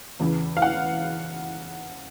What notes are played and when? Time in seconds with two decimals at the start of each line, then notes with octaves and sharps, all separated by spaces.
0.20 E2 C#3 E3
0.57 F5
0.62 F#5